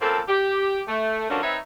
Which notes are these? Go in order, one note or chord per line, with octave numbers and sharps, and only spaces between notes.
C#3 F3 A#3 C4 A4
G4
A3
D3 F3 F#3 A#3 C#4 D4
C4 D#4 B4 C#5 E5